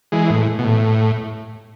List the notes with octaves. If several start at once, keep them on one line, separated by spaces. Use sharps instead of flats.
E3 G#3
A2
B2
A2